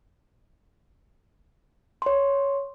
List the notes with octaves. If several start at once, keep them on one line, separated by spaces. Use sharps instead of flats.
C#5 C6